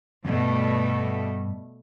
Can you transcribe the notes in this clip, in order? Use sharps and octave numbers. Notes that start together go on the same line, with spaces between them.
E2 G2 B2 G3 A3